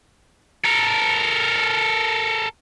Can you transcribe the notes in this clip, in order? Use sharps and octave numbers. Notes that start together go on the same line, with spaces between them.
A4 A#4